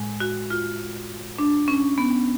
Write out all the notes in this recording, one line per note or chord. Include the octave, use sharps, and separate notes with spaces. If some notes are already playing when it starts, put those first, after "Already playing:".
Already playing: A2 G#3
F#4
F4
D4
C#4
B3